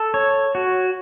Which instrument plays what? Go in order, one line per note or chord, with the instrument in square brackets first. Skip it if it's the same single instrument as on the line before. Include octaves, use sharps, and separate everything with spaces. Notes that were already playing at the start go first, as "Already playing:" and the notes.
Already playing: [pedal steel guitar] A4
C#5
F#4